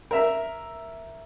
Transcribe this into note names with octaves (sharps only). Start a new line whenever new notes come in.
A#4 E5